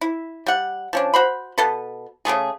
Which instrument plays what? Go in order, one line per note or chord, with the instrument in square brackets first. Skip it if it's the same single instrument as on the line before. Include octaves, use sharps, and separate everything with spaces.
[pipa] E4
G3 F#5
F3 C#4 D4
F#4 C5 B5
B2 A4 B4
C#3 F#3 A3 G#4